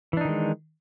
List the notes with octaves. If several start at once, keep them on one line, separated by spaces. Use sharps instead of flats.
D#3 E3 G#3 D4 D#4